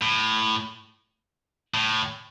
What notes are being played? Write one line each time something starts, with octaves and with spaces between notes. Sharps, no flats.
A2
A2